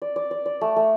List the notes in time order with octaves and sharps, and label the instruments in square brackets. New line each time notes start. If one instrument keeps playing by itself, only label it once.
[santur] D5
D5
D5
D5
A3
A3